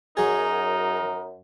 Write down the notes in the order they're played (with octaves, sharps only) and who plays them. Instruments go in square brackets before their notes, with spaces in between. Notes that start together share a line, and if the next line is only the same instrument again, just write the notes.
[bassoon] F#2 [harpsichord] F#3 G#4 [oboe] D#4 [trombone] A#4